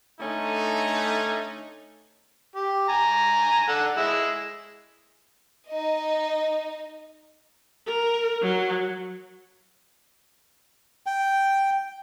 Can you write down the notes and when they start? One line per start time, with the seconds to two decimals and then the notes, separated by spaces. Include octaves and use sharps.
0.20 D3 A3 C#4 D#4
2.56 G4
2.89 G#5 A#5
3.69 A4 F#5
3.97 G#3 E4
5.68 D#4 D#5
7.86 A#4
8.42 F#3
11.06 G5